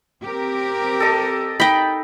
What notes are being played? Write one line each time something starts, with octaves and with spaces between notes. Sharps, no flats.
C4 G4 A#4
A4 D#5
D#4 G5 B5